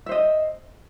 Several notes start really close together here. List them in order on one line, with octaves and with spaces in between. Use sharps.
E5 C5 D#5